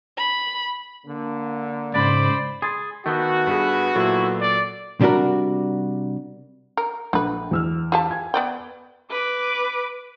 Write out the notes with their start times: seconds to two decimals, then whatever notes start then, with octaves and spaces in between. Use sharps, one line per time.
0.17 B5
1.06 D3 A#3
1.94 G#2 C#3 C5 D5 B5
2.62 G#4 B5 C6 A6
3.06 D#3 A3 B3 F#4 G6
3.47 G2 G#4 B4
3.95 A#2 F#3 E4 A4
4.41 D5
5.01 C3 G3 D4 F#4 A#4
6.77 A#4
7.13 A#1 D3 B4
7.51 E2 E6 F6
7.92 F4 G4 A5
8.10 G#5 G#6
8.34 B3 D5 G5
9.11 B4 D6